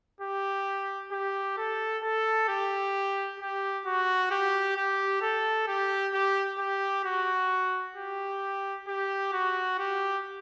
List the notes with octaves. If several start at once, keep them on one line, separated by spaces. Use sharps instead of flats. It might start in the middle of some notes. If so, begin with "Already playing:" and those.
G4
G4
A4
A4
G4
G4
F#4
G4
G4
A4
G4
G4
G4
F#4
G4
G4
F#4
G4